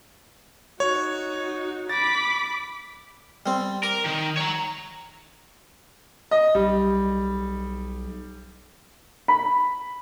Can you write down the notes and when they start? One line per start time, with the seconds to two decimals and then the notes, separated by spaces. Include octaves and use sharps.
0.80 D#4 F#4 C#5
1.89 B5 D6 A6
3.46 G3 C4
3.83 A#4 D6
4.05 D#3
4.36 C#5 A#5
6.31 D#5
6.55 B1 G3
9.28 B5